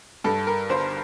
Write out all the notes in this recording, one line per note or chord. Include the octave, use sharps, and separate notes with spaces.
G2 A4
A#4
G1 C5